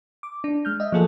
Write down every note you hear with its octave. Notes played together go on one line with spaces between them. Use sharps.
D6
D4
G#3 F6 G6
D#5 E5
F3 F#3 A#3 F4 G#4 A4